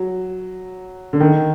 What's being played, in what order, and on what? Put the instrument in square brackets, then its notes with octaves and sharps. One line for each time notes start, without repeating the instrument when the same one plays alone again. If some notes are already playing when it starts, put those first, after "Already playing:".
Already playing: [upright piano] F#3
D3
D#3